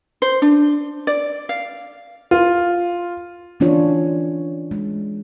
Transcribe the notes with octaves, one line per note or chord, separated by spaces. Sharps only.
C5
D4
D5
F5
F4
E3 C#4 D4 F4 C#5
G#3